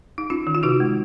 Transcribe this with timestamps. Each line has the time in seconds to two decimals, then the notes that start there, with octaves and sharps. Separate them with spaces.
0.18 D#4
0.30 C#4 F4
0.47 D#3
0.55 F4
0.63 C3 D#4 F#4
0.80 G#3